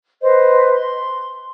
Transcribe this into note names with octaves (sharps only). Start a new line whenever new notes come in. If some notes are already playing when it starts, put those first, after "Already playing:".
B4 C5 D#5
C6